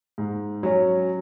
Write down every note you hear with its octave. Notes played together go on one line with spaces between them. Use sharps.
G#2
F#3 C#4